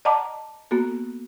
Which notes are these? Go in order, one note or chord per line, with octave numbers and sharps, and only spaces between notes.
D5 D#5 F#5 A5 A#5 D6
A#3 B3 F#4 A4